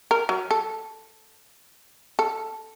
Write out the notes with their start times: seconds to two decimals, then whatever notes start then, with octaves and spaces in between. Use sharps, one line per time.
0.11 A#4
0.29 F#3
0.51 A4
2.19 A4